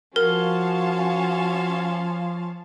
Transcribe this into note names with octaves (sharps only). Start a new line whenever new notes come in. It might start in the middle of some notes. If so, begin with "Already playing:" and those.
F3 C#4 F#4 A#4 F5 A5